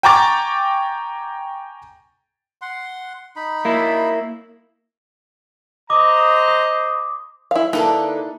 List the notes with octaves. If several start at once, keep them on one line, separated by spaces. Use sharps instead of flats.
G5 G#5 A#5 C#6 D6 A6
F#5 C6
D#4 B5
A#3 E4
C5 D#5 A#5 D6
D#6
E4 F5
D3 A#3 D#4 E4 A4 B4